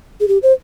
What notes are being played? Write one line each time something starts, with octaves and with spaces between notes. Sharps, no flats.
G#4
G4
C5